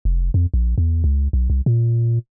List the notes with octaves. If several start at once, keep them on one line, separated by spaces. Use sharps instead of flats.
F1
F2
A#1
E2
C#2
B1
C2
A#2